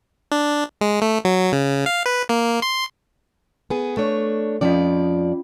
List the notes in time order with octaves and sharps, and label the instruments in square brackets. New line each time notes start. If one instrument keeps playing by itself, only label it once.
[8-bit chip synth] D4
G#3
A3
F#3
C#3
F5
B4
A#3
C6
[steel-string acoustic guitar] B3 G#4
A3 D4 C#5
[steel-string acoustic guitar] F2 F3 D5 [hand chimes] C#4 F4